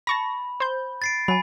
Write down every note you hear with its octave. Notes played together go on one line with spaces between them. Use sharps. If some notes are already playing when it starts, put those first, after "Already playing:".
A5 B5 C#6 A#6
C5 G6
A6 C7 D7
F#3 G#5 B5